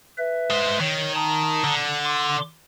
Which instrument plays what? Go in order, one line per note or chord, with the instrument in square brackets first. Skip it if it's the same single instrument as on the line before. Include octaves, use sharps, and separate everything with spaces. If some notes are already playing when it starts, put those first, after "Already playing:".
[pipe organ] B4 E5
[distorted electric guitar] G#3 C5
[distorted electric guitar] D#3 [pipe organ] C#5
[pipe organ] A5 A#5 D#6
[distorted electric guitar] D3
[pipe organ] C6 D6